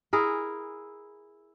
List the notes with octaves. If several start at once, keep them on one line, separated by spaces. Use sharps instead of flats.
E4 G#4 A#4